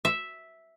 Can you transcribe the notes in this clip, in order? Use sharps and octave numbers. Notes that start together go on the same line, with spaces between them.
E5